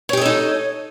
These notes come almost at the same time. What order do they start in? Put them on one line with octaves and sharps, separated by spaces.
C#5 G4 D#5 A4 D#4